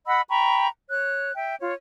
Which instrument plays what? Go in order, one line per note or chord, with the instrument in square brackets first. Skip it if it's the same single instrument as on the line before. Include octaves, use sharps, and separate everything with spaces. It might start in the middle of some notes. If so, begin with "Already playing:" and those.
[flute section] D#5 F#5 B5 E6
G5 A#5 B5 C#6
C#5 F#6
E5 G5
F4 C#5